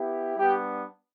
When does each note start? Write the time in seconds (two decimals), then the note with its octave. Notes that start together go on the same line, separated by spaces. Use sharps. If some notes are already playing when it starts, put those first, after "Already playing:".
Already playing: B3 E4 G4
0.37 G3 B3 D4 G4